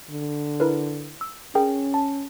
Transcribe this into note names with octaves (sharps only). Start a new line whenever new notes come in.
D3
E4 A#4 B4
E6
C#4 G#4 A#4 G5
A5